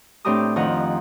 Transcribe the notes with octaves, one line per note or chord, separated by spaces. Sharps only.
A2 C4 D4 G4 A#5 D#6
F2 D#3 F3 F#5 A#5 D#6